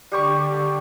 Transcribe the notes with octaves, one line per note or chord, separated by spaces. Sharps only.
D3 G3 G4 C#6